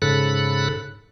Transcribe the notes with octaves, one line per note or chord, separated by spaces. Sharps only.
G#2 C#3 A4 B5 F#6